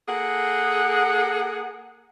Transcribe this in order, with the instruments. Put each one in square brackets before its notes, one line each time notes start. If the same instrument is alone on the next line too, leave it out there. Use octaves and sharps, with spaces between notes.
[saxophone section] A#3 G#4 A4 F#5